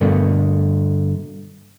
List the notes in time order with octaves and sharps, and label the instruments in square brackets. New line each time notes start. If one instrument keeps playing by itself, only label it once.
[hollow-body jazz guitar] G2 B2 D3 A3 A#3